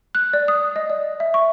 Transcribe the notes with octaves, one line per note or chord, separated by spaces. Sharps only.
F#6
D5
D#6
D#5
D5
E5
C#6